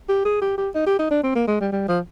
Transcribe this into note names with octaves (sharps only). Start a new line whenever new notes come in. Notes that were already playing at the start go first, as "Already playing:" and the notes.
G4
G#4
G4
G4
D#4
G4
D#4
D4
C4
A#3
G#3
G3
G3
F3